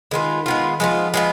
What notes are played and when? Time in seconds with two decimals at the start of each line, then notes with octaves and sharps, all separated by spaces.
0.11 D#3 G#3 B3 F4
0.46 G#3 B3 F4
0.80 F3 G#3 B3 F4
1.14 G#3 B3 F4